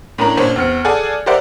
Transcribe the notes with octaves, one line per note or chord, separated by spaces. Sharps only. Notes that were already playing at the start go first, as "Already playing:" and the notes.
A2 C#4 D4 A#4 A#5 F#7
G#1 A#2 C#4 D4 C5 C#5
E2 C4 F6 C#7
G#4 A4 D5 F#5 G#5
G4 A#4 C5 D5 E5 F#5